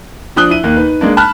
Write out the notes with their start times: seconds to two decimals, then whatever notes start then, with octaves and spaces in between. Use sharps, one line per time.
0.36 F3 D4 D#6 F#6 G7
0.50 E4 D#7
0.63 D#2 A#3 D#4
0.76 D#4 B4
1.01 G#3 A#3 D4
1.17 A5 B5 F6 F#6